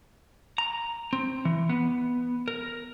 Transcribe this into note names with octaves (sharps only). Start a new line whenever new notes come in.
A#5
C4
E3
B3
A#4